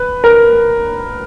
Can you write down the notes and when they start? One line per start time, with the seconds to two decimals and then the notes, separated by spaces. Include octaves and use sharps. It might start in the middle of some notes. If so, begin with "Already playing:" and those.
Already playing: B4
0.24 A#4